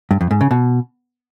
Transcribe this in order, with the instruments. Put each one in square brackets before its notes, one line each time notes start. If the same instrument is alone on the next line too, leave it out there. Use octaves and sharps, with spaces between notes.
[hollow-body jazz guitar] G2
F2
G#2
C#3
B2